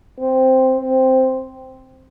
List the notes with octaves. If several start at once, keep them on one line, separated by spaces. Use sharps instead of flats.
C4
C4